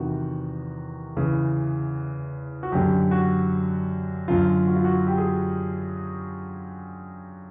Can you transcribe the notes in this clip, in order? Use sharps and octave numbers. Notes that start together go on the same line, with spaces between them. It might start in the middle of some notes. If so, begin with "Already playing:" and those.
Already playing: E2 C3 D#3 F#4
E2 C#3 E3
F#4
F#2 D3 G4
F#4
F#2 D3 F4
F#4
F4
F#4
G4
G#4